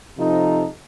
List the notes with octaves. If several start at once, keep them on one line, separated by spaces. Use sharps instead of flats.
C3 F3 D#4 A4